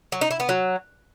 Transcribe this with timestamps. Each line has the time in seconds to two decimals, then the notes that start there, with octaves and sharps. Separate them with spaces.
0.12 F#3
0.21 D#4
0.31 E4
0.40 B3
0.49 F#3